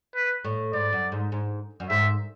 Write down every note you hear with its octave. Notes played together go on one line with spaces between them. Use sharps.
B4
A2
G#2 D5
F#2
G#2
G#2
F#2
G#2 E5